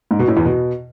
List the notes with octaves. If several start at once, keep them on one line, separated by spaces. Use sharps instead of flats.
G#2
B2
A2
E2
B2